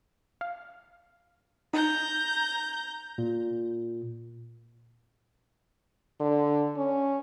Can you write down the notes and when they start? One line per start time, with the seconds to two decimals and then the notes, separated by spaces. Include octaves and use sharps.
0.41 F5
1.73 D#4 A#5 G6
3.18 A#2
6.21 D3
6.77 C#4